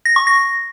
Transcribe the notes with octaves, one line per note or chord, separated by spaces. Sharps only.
A#6
C#6
A#6